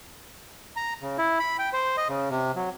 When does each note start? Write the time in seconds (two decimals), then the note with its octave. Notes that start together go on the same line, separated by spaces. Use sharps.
0.76 A#5
1.02 C#3
1.18 E4
1.40 B5
1.59 G5
1.73 C5
1.97 D#5
2.09 C#3
2.30 C3
2.56 F#3